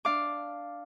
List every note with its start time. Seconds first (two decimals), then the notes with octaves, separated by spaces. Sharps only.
0.05 D4 F5 D6